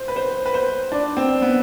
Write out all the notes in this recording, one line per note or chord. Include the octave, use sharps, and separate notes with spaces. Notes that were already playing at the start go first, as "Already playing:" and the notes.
Already playing: C5
B4
C5
B4
C5
D4
C4
B3